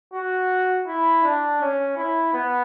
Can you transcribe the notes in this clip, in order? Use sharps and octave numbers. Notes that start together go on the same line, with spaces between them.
F#4
E4
D4
C#4
E4
B3